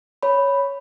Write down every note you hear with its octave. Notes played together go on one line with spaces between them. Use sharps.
C#5 B5